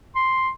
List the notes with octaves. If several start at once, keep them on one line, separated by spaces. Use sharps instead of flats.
C6